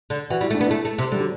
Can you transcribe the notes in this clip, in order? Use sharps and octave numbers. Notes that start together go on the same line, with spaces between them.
D3
E3 F#4
G3 E4
A3
D4
B3
A3 E4
A3
C3
D3 G3
F#3